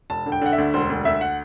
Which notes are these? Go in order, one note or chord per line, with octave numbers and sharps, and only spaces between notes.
E1 A5
D3
G5
D3 F#5
E5
D2
E1 C5
D2
D2 E5
F#5